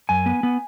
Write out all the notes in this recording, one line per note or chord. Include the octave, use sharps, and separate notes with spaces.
F#2 G#5
B3
B3